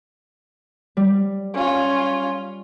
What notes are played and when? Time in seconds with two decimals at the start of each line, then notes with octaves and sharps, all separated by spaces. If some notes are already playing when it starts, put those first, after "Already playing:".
0.97 G3
1.54 C#4 F4